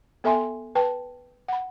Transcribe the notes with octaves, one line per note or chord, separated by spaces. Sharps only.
B3 A4 E5 G#5 C6
B4 G5 A5
F#5 B5